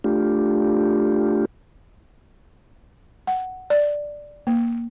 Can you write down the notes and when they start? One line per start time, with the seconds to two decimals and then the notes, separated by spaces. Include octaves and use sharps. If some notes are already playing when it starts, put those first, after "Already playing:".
0.04 A3 D4 F4 G4
3.27 F#5
3.70 D5
4.47 A#3